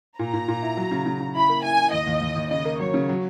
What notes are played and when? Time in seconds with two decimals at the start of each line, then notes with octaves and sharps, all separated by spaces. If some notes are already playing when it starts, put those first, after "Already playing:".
0.19 A#2 A#5
0.33 A#2
0.48 A#2
0.62 E4
0.77 F#3
0.91 C#3
1.06 C#3
1.20 C#3
1.35 E4 B5
1.49 A#3
1.64 E4 G#5
1.78 E4
1.92 D#2 D#5
2.07 D#2
2.21 D#2
2.36 D#2
2.51 C#3 D#5
2.65 A#3
2.79 F#3 C#5
2.94 C#3
3.09 F#3